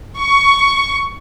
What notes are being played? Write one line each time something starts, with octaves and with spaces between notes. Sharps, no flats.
C#6